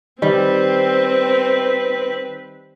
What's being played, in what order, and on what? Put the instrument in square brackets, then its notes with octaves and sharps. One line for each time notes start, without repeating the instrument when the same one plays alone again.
[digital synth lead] D#3 [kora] G3 [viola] C4 [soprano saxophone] B4